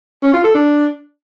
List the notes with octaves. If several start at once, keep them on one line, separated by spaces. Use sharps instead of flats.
C#4
F4
A4
D4